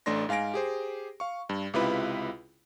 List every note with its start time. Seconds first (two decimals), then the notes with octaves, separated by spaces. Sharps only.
0.06 A1 A3 D4 C6 A#6
0.29 G#2 F5 G#5 A#6 D7
0.54 G4 G#4 C5
1.20 F5 C#6
1.49 G2
1.74 C#2 C3 E4 F4 B4 B5